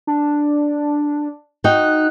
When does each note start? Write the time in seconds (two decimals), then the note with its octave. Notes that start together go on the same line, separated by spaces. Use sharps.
0.07 D4
1.64 D#4 F#4 G5 F#6